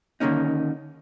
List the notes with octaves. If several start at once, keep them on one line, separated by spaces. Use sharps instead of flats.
D3 D#3 F3 A#3 C#4 D#4